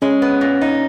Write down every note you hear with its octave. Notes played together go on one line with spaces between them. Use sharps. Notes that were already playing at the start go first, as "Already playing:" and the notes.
G#3 C#4 C#5
B3
A#2
D#4